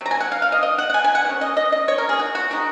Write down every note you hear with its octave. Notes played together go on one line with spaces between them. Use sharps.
C3 F#3 A#5
G#5
F#5
F5
F5
D#5
D#5
F#5
F#5
G#5
G#5
F#5
C3 D#3 C#4
D#5
D#5
D#5
C#5
A#4
G#4
F#4
F#4
D#3 G#3 D#4 F#4